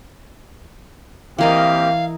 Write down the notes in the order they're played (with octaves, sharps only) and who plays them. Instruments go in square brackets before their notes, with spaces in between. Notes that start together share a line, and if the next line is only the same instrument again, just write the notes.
[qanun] E3 A#4 D#5 [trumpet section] A#3 C4 G4 [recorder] F5